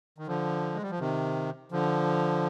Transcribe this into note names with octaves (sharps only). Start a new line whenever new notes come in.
D#3
D3 F3
G#3
G3
F3
C3 D#3
D3 F3